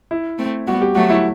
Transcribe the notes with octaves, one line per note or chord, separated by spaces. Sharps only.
E4
A3 C4
G3 B3 F#4
G4
F#3 A3 F#4
E4